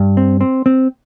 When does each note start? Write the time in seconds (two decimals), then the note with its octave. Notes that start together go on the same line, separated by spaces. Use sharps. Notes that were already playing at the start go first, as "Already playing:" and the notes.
Already playing: G2
0.17 C4
0.41 C4
0.66 C4